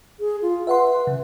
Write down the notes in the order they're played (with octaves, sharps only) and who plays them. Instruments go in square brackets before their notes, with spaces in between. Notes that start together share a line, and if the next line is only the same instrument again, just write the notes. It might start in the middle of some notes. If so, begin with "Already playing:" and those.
[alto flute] G#4
F4
[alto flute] B4 [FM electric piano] E5 F#5 C6
[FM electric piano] C#3